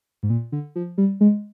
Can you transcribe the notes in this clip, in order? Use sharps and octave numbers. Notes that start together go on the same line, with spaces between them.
G#2
A#2
D3
F3
G3
G#3